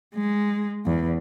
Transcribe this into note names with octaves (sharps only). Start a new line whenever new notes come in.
G#3
E2